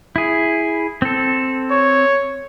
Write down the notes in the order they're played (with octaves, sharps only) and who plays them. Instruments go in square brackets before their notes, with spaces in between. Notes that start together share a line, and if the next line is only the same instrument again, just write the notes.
[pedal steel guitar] E4 G#4
C4 A4
[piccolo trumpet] C#5